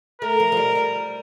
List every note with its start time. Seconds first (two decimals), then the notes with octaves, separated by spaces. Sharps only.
0.22 A3 A#4
0.40 F3
0.52 F3
0.57 G3
0.75 G3